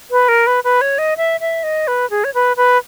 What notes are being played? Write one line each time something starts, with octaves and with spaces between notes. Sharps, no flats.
B4
A#4
B4
B4
C#5
D#5
E5
E5
D#5
B4
G#4
C#5
B4
B4